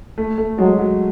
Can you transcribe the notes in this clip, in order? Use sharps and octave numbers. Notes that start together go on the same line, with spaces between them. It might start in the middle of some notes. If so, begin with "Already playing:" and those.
A3
A3
F#3 G#3
F#3